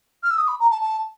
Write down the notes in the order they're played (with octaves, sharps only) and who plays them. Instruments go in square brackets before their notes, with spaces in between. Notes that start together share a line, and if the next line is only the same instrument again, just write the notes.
[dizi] F6
E6
D#6
B5
A#5
A5
A5